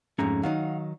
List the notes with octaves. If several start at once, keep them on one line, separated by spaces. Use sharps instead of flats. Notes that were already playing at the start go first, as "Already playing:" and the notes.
F2 G#2 A3 C#4 G#4 A#5
D#3 F#3 D#4 F5 F#5